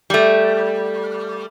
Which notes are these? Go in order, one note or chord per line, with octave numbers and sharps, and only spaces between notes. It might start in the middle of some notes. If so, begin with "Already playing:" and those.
G3 A3